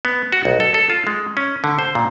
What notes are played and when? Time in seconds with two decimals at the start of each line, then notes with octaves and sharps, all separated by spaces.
0.05 B3
0.32 F#4
0.45 B1
0.60 A4
0.74 A4
0.90 F4
1.07 G#3
1.37 C#4
1.64 D3
1.79 C5
1.95 A#2